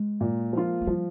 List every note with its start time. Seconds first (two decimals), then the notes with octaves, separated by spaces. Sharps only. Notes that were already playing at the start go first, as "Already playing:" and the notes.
Already playing: G#3
0.21 A#2
0.53 F3 A#3 F4
0.81 G#3
0.87 F3 G3